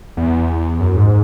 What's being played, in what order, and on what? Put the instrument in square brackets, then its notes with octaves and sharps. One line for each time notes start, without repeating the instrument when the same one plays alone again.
[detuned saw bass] E2
F#2
G#2